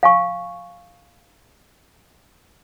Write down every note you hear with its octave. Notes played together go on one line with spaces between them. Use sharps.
F5 G#5 C#6